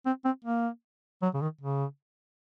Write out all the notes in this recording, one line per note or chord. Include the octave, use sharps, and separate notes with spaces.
C4
C4
A#3
F#3
C#3
D#3
C#3